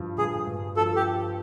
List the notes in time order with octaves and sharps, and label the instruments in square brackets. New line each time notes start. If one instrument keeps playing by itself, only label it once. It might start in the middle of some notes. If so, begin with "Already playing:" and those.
Already playing: [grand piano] G2 F3
[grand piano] G2 [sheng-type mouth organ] G#4
[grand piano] G2
[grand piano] F3 [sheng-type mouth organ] A4
[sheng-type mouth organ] G4